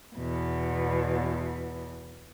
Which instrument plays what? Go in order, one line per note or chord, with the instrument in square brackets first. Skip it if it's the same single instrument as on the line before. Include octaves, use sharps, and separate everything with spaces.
[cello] E2 B2